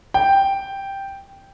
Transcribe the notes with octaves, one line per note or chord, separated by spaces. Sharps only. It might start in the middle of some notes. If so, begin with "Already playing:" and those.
G5